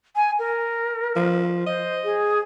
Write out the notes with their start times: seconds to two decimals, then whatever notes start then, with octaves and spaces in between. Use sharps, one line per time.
0.16 G#5
0.39 A#4
1.16 F3
1.66 C5 D#5
2.04 G#4